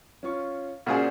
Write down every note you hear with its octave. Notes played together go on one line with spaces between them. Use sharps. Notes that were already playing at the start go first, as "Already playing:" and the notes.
C#4 F4 C#6
A#2 C#3 F#4 G#4 C5 D5